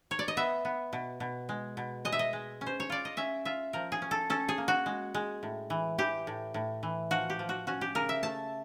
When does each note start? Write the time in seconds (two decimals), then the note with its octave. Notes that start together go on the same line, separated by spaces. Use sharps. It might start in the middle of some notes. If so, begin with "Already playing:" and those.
0.11 C#5
0.19 D5
0.28 D#5
0.37 B3 E5
0.65 B3
0.93 B2
1.20 B2
1.49 G#3
1.77 B2
2.05 G#3 D#5
2.12 E5
2.19 D#5
2.33 G#3
2.61 C#4
2.66 C5
2.80 C#5
2.90 F4 D5
3.05 D#5
3.17 C#4 E5
3.45 F4 E5
3.73 F3 A#4
3.92 G#4
4.02 C#4
4.11 A4
4.30 C#4 A4
4.49 G#4
4.58 A#3
4.68 F#4
4.86 G#3
5.14 G#3
5.43 A2
5.70 E3
5.98 E3 G4
6.27 A2
6.54 A2
6.83 E3
7.11 F3 F#4
7.30 G4
7.39 F3
7.49 F#4
7.67 C#4 F#4
7.81 G4
7.95 C#3 A#4
8.09 E5
8.23 A3 A5